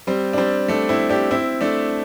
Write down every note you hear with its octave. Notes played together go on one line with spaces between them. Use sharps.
G3 C4
D4
G3 C4
A3 D4
C4 E4
D4 G4
C4 E4
A3 D4